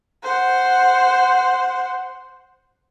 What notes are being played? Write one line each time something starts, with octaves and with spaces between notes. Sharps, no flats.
C5 F#5